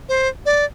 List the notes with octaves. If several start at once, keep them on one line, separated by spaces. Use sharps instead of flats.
C5
D5